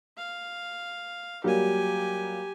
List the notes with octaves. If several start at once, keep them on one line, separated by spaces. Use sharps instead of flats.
F5
F#3 G3 A#3 G4 G#5